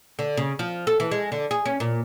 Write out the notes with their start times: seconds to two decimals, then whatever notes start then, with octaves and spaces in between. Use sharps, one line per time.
0.19 D3
0.37 C#3
0.59 F3
0.87 A4
1.00 E3
1.11 G#3
1.32 D3
1.51 G#4
1.66 C#4
1.80 A#2